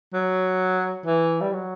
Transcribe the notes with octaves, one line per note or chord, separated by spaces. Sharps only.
F#3
E3
G3
F#3